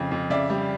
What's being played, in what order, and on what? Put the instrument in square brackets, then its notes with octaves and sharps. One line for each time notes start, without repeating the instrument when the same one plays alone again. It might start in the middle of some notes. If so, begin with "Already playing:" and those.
Already playing: [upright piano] F2 C#3
F2
C#3 D5 E5
G3